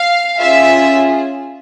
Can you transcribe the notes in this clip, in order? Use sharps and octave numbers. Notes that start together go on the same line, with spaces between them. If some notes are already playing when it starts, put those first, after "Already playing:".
Already playing: F5
C#4 F4 G#4 E5